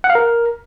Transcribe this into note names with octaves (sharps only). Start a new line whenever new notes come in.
F#5
F5
A#4